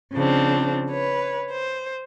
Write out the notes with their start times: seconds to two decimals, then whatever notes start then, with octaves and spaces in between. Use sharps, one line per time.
0.13 C#3 F3 C4 D4
0.90 B4 C#5
1.51 C5